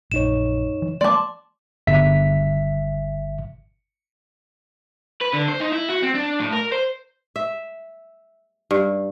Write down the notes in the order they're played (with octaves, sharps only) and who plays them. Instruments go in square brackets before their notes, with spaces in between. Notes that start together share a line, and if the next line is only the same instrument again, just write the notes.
[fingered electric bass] A#1 [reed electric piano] F#2 D#4 C#5 [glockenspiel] E7
[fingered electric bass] E3
[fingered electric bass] F3 G#3 A#3 [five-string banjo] D5 A5 [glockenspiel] C6 D6
[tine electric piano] G1 E5 B6
[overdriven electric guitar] B4
D3
C5
D#4
E4
F#4
C4
D4
A2
A#4
C5
[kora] E5
G2